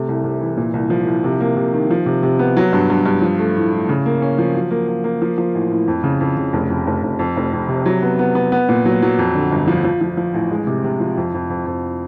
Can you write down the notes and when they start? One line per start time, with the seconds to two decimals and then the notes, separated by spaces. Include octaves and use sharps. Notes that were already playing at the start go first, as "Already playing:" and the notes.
Already playing: C3 A3
0.08 C2
0.24 C3
0.41 E3
0.57 A#2
0.74 C2
0.90 F3
1.07 C2
1.24 C3
1.41 A#3
1.57 C3
1.74 D#3
1.90 F3
2.06 C3
2.23 C3
2.39 B3
2.57 F#3
2.73 G2
2.90 G2
3.06 G2
3.22 F3
3.39 A3
3.56 A2
3.72 A2
3.89 C#3
4.06 A#3
4.22 C#4
4.38 F3
4.55 F#3
4.71 A#3
4.88 A#3
5.04 A#3
5.22 F3
5.38 F3
5.55 A1
5.71 A2
5.88 F2
6.04 C#3
6.20 F2
6.37 C#3
6.53 F1
6.70 F2
6.87 F1
7.03 F1
7.19 F2
7.37 F1
7.53 F2
7.69 C3
7.86 F#3
8.02 B3
8.19 B3
8.35 B3
8.52 B3
8.69 A#2
8.85 F#3
9.02 F#3
9.18 F2
9.35 D3
9.52 G1
9.68 F3
9.84 F3
10.01 F3
10.17 F3
10.34 A1
10.51 G#3
10.67 C3
10.84 C3
11.00 F3
11.17 F2
11.34 F2
11.50 F2
11.66 F2